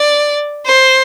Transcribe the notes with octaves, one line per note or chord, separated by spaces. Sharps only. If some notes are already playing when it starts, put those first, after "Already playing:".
Already playing: D5
C5